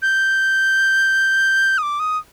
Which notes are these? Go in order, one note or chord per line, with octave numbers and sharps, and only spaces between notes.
G6
D#6
D6
D#6